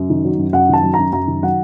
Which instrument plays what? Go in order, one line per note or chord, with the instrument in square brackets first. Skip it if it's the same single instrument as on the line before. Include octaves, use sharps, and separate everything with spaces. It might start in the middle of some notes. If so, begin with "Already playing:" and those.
Already playing: [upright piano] F#2
D#3
F#3
F#2
F#2 F#5
D#3 A5
F#3
F#2 A#5
F#2 A#5
D#3
F#3 F#5